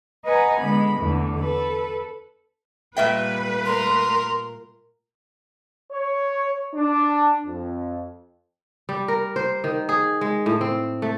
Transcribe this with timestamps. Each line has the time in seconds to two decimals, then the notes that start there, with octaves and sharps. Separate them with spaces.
0.25 B4 D#5 F#5 G#5 A#5
0.59 D3 G#3 B3 B5
0.98 E2 D3 A3
1.39 A4 B4
2.97 A#2 G3 A3 B4 E5 G5
3.66 A#4 C6
5.92 C#5
6.75 D4
7.47 F2
8.89 G3
9.08 A#4
9.36 C5
9.64 D#3
9.89 G#4
10.21 G#3
10.46 A2
10.61 C4
11.02 A3